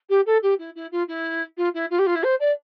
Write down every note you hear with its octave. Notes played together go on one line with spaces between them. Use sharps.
G4
A4
G4
E4
E4
F4
E4
F4
E4
F4
G4
F4
E4
C5
D5